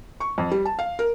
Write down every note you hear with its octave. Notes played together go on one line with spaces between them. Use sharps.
C#6
F2
G3
A5
F5
A#4